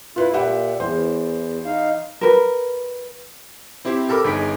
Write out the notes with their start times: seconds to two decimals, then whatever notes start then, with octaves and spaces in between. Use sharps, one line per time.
0.16 E4 F4 B4
0.33 A#2 G4 E5 F#5
0.80 E2 E3 C5
1.66 D#4 F5
2.21 A#4 B4
3.85 C4 E4 G4 C5
4.09 G4 A4 A#4 B5 D6
4.24 G1 D#4 G#4 B6 D7